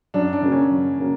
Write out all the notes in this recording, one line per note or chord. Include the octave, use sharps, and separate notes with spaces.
F#2 D4
D4
C#3 F#3 A#3
C#4
F#2
C#3 F#3 A#3